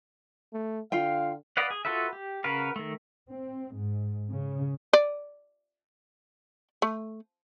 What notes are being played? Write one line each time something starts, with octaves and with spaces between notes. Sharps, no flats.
A3
D3 F4 F5 G5
B4 D5 D#5 F5 F#5
G#4
F4 F#4 A4 B4 E5
G4
C#3 F#4 A#4 B4 F5
D#3 A3
C4
G#2
C#3
D5
A3